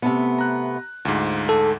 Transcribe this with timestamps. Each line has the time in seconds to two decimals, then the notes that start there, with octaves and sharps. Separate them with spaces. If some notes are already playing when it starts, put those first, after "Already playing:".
0.02 C3 A3 B3
0.38 A#5 F#6
1.05 D2 G#2 F4
1.49 A4